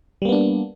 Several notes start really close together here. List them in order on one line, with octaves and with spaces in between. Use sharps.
G3 A#3 B3 D4